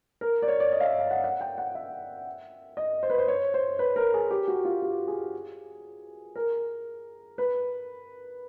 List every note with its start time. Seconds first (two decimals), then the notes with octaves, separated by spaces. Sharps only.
0.21 A#4
0.42 D5
0.48 C#5
0.60 D5
0.72 D#5
0.80 F5
0.85 E5
0.99 F5
1.11 F#5
1.24 F#5
1.41 G5
1.58 F#5
1.75 E5
2.77 D#5
3.03 C5
3.10 B4
3.18 C5
3.28 C#5
3.54 C5
3.79 B4
3.96 A#4
4.14 G#4
4.31 G4
4.48 F#4
4.65 F4
4.82 G4
5.08 G#4
6.36 A#4
7.38 B4